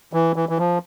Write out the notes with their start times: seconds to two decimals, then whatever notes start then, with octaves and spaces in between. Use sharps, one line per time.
0.13 E3
0.36 E3
0.49 E3
0.58 F3